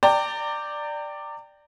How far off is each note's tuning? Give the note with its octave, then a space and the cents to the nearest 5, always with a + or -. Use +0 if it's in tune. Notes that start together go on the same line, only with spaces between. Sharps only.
D5 +5 G5 +0 A#5 -35